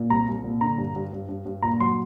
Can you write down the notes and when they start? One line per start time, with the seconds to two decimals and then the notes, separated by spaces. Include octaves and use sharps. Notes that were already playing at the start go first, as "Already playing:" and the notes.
Already playing: A#2
0.10 C2 A#5
0.28 C2
0.44 A#2
0.61 D3 A#5
0.78 G2
0.96 G2
1.13 G2
1.29 G2
1.46 G2
1.62 A#2 A#5
1.80 F#3 C6